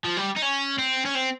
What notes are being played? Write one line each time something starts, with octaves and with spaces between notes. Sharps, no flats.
F3
G3
D#4
C#4
C4
C#4
C4